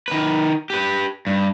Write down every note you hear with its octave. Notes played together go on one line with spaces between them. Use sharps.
D#3 B4
G4 B4
G2